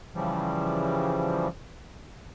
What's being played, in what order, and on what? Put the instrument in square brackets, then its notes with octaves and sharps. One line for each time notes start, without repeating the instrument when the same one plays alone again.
[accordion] C#3 E3 F3 G3